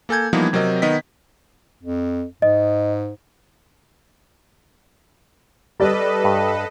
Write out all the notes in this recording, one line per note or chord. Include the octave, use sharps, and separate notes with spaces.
A#3 A4 G#5 G6 G#6
E3 F3 G3 A#3 B3 D#4
C3 F#3 C4 A#4 D#5
D#3 B3 D#5 B6
F2
G#2 D#5
G3 A4 B4 D5 D#5
G2